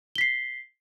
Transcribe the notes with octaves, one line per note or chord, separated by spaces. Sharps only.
B6 C7 G7